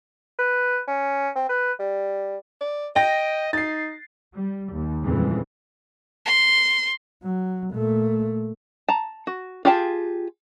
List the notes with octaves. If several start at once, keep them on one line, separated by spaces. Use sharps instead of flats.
B4
C#4
C4
B4
G3
D5
D#5 G5 A#6
D#4 A6 C7
G3
D#2
F2 A#2 C#3 E3 G3 G#3
C6
F#3
A#2 A3
A5 A#5
F#4
F4 G4 G#4 G5 A5